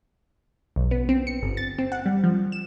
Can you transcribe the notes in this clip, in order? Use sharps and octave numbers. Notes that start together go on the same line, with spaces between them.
B1
B3
C4
C#7
G1
A6
C4
F#5
G3
F3
E7